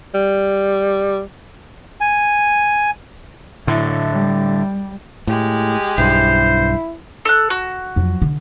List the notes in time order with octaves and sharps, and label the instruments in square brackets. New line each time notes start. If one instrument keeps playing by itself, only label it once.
[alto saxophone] G3
[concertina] G#5
[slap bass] A2 D3 [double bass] F#3 E4
[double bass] G3
[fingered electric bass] A2 [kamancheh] G#3 G4
[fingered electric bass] B1 G2 [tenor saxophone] E4 [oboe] C5
[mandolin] A4 F#6
F#4
[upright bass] F2 F#3
D3